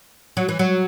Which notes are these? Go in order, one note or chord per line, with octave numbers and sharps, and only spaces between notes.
F#3
E3
F#3